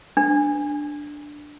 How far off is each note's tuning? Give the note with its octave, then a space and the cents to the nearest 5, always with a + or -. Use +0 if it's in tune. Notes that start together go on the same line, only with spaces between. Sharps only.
D4 +5